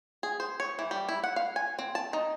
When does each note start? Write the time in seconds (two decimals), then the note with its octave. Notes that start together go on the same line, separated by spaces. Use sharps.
0.23 G#4
0.40 C5
0.60 C#5
0.79 E3
0.91 G3
1.09 E4
1.24 F#5
1.36 F5
1.56 G#5
1.79 C4
1.95 A5
2.13 D#4